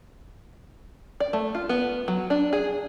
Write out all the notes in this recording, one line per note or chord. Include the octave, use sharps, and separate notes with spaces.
D5
A3
F4
B3
F#3
D4
G#4